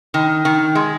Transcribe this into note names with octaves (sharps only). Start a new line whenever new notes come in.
D#3
D#3
G#3